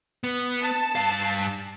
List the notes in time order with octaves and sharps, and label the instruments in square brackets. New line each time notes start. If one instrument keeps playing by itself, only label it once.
[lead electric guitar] B3
[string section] A5
[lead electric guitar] G2 F5